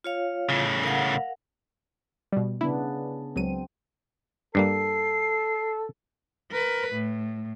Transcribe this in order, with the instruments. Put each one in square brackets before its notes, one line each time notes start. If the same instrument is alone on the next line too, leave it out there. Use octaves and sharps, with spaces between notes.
[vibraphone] F4 C#5 F5
[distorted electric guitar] A2 C#3
[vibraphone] A#4 F5 F#5
[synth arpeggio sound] B2 G3
[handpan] C#3 B3 D4 [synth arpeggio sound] E4
[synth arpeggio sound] C#2 F#3 D#7 [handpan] C4
[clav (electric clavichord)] G2 G3 A#3 [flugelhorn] A4 [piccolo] C7
[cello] A#4 B4
A2